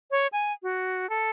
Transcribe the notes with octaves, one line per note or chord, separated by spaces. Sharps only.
C#5
G#5
F#4
A4